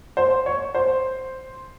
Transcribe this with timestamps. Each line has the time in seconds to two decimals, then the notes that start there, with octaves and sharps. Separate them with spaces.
0.17 C5
0.46 C#5
0.75 C5